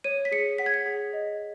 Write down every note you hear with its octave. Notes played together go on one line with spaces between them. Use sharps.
C#5 D#7
B6
G#4 C#7
F#5 B6
G#6
B6
G#4
D#5